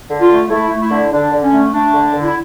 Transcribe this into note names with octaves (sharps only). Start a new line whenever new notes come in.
D3
F4
A3
A3 E4
A3
E4
D3
D3 D4
D3
C#4
A3
A3 D4
D3
D3
E4